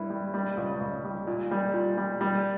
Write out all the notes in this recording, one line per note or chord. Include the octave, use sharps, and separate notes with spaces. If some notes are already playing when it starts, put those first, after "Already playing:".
Already playing: G2 E4
G3
G3
C#2
C#2
G3
A#2
G3
A#2
G3
G3